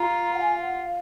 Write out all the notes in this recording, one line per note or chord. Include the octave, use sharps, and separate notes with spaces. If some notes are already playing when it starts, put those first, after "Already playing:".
Already playing: F4 A#5
F#5
G#5
F5
F#5
F5